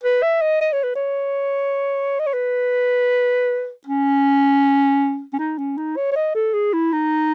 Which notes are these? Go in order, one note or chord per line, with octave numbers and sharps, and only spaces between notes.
B4
E5
D#5
D#5
C#5
B4
C#5
D#5
C#5
B4
C#4
C#4
D#4
C#4
D#4
C#5
C#5
D#5
A4
G#4
E4
D#4